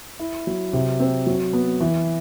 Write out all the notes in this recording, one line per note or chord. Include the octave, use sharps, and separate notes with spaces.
E4
F#3
C3
C4
F#3
B3
E3